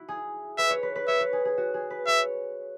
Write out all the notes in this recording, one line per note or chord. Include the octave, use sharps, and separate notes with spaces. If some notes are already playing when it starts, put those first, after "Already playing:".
Already playing: E4 F#4
G#4
B4 E5
C#5
B4
B4
C#5 E5
B4
G#4
G#4
F#4
G#4
B4
C#5 E5